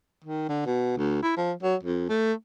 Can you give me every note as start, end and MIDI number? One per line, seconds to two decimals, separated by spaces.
0.24 0.47 51
0.49 0.65 50
0.66 0.97 47
0.97 1.22 38
1.22 1.34 64
1.37 1.52 53
1.63 1.75 54
1.83 2.05 41
2.09 2.33 57